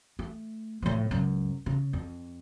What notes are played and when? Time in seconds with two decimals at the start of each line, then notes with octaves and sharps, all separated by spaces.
0.19 A3
0.82 A2 F3
1.11 C#2 F#2
1.66 C#3
1.93 F2